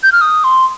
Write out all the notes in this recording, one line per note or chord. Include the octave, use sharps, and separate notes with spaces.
G6
F6
D#6
C6